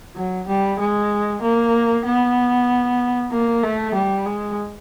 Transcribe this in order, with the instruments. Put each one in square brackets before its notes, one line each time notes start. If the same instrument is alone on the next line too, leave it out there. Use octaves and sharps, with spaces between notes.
[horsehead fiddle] F#3
G3
G#3
A#3
B3
A#3
A3
G3
G#3